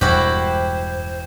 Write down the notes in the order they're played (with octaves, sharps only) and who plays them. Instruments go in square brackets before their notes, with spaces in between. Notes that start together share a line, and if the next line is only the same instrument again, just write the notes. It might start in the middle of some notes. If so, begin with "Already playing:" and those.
[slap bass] E1 [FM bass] G2 [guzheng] E4 F#4 G4 [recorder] C5